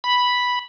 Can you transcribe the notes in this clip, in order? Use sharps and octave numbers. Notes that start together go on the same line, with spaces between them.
B5